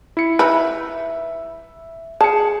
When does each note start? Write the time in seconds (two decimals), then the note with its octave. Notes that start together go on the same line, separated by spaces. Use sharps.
0.17 E4 C#7
0.39 D#4 B4 E5 E6
2.21 G#4 A5 C#7